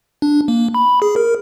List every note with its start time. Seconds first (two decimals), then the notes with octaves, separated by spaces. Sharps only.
0.22 D4
0.48 A#3
0.74 B5
1.02 G#4
1.16 A#4